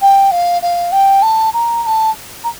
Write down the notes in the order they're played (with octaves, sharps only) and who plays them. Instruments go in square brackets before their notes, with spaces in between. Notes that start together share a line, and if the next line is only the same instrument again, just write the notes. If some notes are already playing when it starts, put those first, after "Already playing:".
[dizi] G5
F5
F5
G5
A5
A#5
A#5
A5
A#5